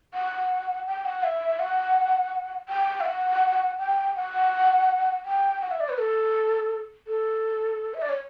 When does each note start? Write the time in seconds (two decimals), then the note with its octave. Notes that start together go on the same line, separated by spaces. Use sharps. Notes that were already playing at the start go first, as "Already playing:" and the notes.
0.14 F#5
0.86 G5
1.05 F#5
1.24 E5
1.59 F#5
2.69 G5
3.01 E5
3.06 F#5
3.78 G5
4.16 F#5
5.26 G5
5.62 F#5
5.71 E5
5.80 D5
5.89 B4
5.98 A4
7.07 A4
7.94 E5
8.02 D5
8.09 C#5